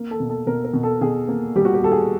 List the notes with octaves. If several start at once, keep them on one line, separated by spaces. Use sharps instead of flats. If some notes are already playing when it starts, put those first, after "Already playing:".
Already playing: A#3
A4
B2
A4
B2 A#4
A#4
B2
A4
B2 G#4
A#3
G3 G4
F#4
G4
G3 A4
G#4